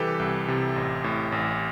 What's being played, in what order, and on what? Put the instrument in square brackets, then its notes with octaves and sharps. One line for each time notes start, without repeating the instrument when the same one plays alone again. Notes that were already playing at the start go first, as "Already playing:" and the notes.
Already playing: [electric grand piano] C2 C3 E3 G3 G4 A4 B4
C2
C3
A1
A2
A1